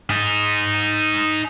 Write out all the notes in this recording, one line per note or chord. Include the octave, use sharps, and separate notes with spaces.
D#4 G#4